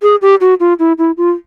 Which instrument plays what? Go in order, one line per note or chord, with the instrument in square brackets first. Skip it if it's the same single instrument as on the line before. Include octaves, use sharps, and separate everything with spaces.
[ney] G#4
G4
F#4
F4
E4
E4
F4